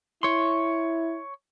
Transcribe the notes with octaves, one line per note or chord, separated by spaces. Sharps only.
E4 C#5 C6